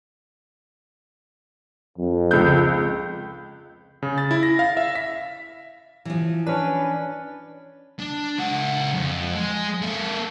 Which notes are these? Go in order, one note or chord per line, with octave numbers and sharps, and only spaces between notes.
F2
C#2 G6
C#3
A6
E4
A#6
F5
E5
B6
E3 F3
C#4 D4 B4
D4
C#2 F#5
F2
G#3
A#3 A4